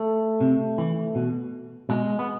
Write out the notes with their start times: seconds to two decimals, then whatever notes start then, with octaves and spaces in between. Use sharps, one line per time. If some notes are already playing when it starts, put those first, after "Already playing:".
Already playing: A3
0.41 C3
0.78 E3
1.15 B2
1.89 B2 G#3
2.19 B3